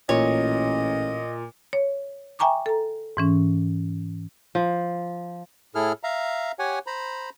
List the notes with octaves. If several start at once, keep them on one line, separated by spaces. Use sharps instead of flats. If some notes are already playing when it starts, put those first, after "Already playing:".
A1 A#2 C#5 D#5
C#5
E5 G5 G#5 A#5 C#6 D6
A4 A#5
G#2 E3 C#4
F3
A2 E4 G#4 A4 F6
E5 F5 A#5
G4 C#5 F#5 G#5
C5 A#5 B5